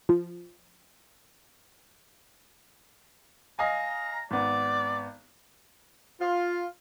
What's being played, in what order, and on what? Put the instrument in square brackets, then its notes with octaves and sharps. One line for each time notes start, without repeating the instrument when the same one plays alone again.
[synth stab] F3
[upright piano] D#5 F5 G#5 [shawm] A#5
[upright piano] G#1 B3 [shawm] D5
[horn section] F4